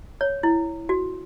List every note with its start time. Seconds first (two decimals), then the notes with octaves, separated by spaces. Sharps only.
0.21 C#5
0.43 E4
0.89 F#4